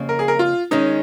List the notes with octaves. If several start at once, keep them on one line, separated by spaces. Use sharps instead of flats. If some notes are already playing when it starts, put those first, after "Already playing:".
Already playing: F2 C#3 A#3
A#4
G#4
A#4
F4
D#3 G#3 C#4 D#4